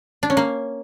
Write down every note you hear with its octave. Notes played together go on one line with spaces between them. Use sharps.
D4
C#4
A#3